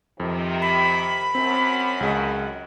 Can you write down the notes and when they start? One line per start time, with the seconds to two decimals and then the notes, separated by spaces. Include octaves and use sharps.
0.20 F2 C3 D#3
0.61 B5
1.35 F#2 C4
2.01 C#2 G#4 D#5